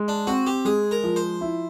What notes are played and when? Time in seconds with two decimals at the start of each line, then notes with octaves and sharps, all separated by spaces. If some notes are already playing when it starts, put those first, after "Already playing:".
Already playing: G#3
0.08 D4
0.27 C4 F#4
0.47 G4
0.65 G#3 G#4
0.91 A#4
1.04 F3
1.16 C5
1.41 E4